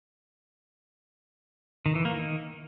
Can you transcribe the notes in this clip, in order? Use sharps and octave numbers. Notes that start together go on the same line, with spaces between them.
D#3
E3
A#3
D#3